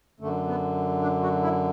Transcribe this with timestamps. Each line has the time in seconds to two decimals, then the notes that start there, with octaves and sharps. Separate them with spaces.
0.20 F#2 D3 A3
0.48 B3
1.02 D4
1.22 F#4
1.43 E4